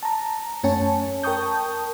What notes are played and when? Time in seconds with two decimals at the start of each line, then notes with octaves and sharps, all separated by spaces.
0.03 A5 A#5
0.63 F#2 A3 C#4 C#5 G#5 A5
1.23 A#4 G5 A5 C#6 D#6 G6